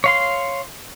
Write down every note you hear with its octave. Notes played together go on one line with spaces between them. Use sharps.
C#5 F5 C6